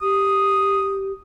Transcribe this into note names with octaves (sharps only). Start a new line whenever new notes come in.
G4 D#6